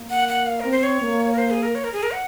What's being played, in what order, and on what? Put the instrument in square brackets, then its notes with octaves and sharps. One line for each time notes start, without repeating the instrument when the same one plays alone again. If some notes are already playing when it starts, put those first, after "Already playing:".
Already playing: [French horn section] A#3
[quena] F#5
F#5
F5
[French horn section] C4 [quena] A#4
[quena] C5
C#5
[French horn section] A#3
[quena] A#4
C5
G#4
A#4
C#5
A#4
G#4
A#4
F#5